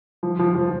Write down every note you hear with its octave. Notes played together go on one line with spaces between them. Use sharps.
F3
F3
F3